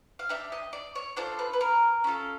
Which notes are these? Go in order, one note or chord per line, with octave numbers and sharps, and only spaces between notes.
F5
D4 G4 E5
D#5
D5
C#5
D4 F4 A4 C5
B4
B4
A#4
C#4 F4 A4